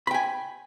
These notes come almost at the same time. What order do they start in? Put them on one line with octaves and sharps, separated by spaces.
B5 G5 G#5